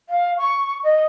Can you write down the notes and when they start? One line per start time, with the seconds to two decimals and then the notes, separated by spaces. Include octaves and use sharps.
0.09 F5
0.38 C#6
0.83 D#5